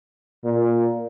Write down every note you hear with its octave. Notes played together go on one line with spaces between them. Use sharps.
A#2